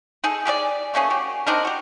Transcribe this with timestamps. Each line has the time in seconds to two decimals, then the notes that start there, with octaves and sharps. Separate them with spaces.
0.24 D#4 G#4 A4
0.45 G4 G#4 A#4 D5
0.94 A3 A#3 C#4 G#4
1.10 F#4 G4
1.47 C4 D4 D#4 A#4
1.65 F#4 G4